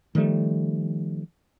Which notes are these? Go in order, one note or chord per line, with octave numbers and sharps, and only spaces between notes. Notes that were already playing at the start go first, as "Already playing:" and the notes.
D#3 F3 G3 A3